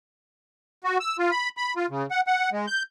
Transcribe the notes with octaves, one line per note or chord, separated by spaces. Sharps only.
F#4
E6
F4
B5
B5
F4
C#3
F#5
F#5
G#3
G6